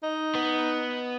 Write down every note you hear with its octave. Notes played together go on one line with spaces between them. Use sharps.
D#4
B3